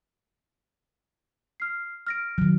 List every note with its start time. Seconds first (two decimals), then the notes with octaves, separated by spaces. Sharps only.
1.60 F6 C7
2.06 F6 A#6 D7
2.38 D#3 F#3